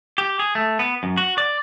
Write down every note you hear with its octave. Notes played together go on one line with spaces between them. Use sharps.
G4
G#4
A3
B3
F#2
F#4
D5